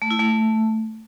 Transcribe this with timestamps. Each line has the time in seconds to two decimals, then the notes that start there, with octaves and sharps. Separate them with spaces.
0.02 A3
0.10 E4
0.19 A3